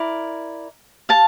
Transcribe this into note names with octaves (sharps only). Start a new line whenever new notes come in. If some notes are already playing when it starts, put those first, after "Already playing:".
Already playing: E4 A#4 D5
F5 A5